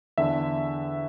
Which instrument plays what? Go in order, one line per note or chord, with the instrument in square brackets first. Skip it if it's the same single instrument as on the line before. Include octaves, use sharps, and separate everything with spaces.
[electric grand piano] E2 D3 E5